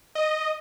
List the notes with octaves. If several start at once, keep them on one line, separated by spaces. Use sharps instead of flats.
D#5